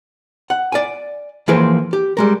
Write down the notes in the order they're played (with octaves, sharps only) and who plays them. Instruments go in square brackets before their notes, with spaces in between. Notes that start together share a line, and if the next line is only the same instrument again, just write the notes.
[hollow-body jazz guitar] F#5
D5 G#5
E3 F3 A#3 G#4 B4 C5
G4
G3 G#3 A#4